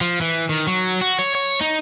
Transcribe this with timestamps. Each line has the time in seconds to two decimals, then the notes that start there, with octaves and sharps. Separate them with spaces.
0.01 F3
0.21 E3
0.49 D#3
0.67 F#3
1.01 F#4
1.19 C#5
1.35 C#5
1.61 D#4